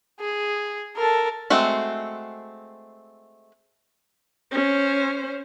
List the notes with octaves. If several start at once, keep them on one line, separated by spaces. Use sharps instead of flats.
G#4
A4 A#4
G#3 A3 C4 F#4
C#4 C5